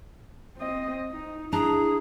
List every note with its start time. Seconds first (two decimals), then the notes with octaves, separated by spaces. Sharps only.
0.57 C4 D#5
1.12 D#4
1.53 D4 E4 G#4 A#5